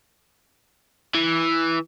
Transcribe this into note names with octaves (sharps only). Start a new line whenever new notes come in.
E3